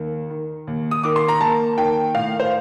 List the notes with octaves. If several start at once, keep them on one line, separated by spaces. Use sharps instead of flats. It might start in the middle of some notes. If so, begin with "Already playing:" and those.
Already playing: D#2 D#3
D#3
D#2
D#6
D#3 D6
C6
A#5
A#3 A5
D#3 G5
A2 F5
C5